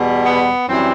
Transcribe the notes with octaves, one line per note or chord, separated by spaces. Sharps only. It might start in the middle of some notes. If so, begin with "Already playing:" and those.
Already playing: E2 B2 G3
B3
F#2 E3 G3 C4